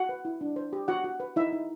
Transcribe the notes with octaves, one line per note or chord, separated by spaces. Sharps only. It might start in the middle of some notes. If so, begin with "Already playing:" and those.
Already playing: F#4 F#5
B4
E4
D4
C5
G4
F#4 F#5
F#4
B4
D#4 E4 E5
D#4